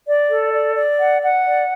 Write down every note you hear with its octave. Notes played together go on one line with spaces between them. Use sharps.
D5
A4
D5
D5
F#5
F#5
D5